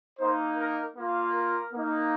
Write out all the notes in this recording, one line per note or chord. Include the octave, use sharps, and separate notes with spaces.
A#3 D#4 C5
A#4
A#3 F4
A#4
A#3 D#4